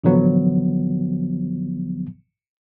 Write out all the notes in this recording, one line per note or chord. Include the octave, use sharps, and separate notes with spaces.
A1 D3 F3 F#3 B3